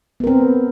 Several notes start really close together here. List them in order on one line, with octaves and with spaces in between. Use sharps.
B3 A#4 C4